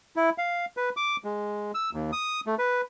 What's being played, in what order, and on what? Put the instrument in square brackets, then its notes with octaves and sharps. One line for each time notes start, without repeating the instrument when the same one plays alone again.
[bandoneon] E4
F5
B4
D6
G#3
E6
D#2
D#6
A3
B4